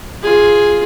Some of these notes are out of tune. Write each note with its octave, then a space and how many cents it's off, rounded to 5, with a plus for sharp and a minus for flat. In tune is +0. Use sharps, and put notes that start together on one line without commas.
F4 +0 G#4 +0